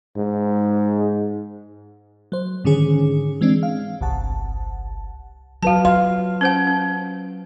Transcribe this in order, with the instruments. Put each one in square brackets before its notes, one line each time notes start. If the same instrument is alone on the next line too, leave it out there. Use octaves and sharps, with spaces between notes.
[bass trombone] G#2
[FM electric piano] F#3 C5
G#2 D3 D#3 C#4 G#4
E3 G#3 C4 D4
F5
G1 C2 F#5 A5
[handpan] F#3 B4 F5 [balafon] F#4 A5
[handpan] F5 [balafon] C6
[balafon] C#4 C5 F#5
C#4